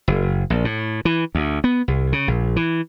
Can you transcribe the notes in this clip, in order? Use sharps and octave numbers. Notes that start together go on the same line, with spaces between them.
F#1
A#1
A2
E3
D2
B3
C2
C#3
A#1
E3